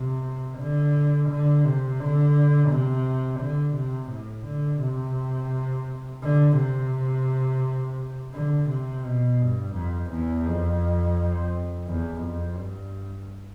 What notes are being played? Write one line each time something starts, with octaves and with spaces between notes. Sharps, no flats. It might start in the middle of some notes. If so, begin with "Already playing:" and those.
Already playing: C3
D3
D3
C3
D3
C3
D3
C3
A2
D3
C3
D3
C3
D3
C3
B2
G2
F2
E2
F2
E2
F2
G2